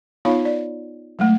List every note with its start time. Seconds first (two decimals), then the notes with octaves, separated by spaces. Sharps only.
0.25 B3 D#4 F4 C#5 F5 B5
0.45 D5
1.19 F#3 G#3 A3